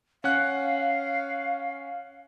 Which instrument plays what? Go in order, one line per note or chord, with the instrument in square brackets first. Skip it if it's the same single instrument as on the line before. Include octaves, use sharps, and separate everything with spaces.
[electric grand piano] C#4 F#5 F#6 [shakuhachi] F5